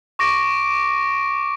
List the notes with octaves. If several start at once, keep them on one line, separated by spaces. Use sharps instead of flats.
C#6 D6 A#6 D7